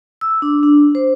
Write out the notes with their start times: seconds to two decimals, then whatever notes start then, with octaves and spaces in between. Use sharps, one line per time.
0.21 E6
0.42 D4
0.63 D4
0.95 C5